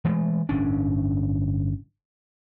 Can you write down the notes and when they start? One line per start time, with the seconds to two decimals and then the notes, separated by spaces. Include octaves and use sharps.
0.05 E3 G#3 A3
0.49 G1 A2 C#4 D4